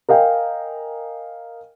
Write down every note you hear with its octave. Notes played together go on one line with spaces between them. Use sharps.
A#4 D#5 F5 G5 G#5